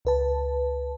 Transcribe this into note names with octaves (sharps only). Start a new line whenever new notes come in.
C#2 B4 A5